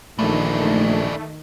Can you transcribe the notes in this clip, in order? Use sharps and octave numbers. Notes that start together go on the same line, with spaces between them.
A#1 D#3 E3 A3 D4